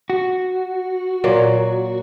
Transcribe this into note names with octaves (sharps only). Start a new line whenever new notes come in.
F#4
A#2 F#3 A#3